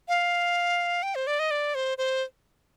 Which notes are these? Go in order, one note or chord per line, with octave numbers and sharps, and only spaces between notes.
F5
G5
C5
D5
D#5
D5
C5
C5